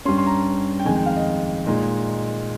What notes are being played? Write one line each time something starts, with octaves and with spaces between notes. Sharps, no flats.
G2 G3 C#4 C6
C6
A#5
G5
F2 D#3 G#3 G#5
G5
F5
D#5
A#2 G#3 D#4